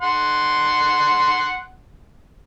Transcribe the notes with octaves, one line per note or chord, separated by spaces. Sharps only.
F#5 C6